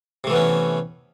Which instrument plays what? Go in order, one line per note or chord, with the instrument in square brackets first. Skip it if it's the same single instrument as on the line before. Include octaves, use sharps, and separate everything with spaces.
[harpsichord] C3
A3
E3
B3
C#4